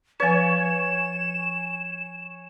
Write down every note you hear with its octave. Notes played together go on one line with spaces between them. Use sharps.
F3 B4 C#5 G#5 E7